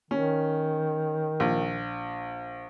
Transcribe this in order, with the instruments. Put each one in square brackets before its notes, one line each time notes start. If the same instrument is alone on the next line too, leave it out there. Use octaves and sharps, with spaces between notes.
[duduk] D#3 [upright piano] C#4
[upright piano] A#1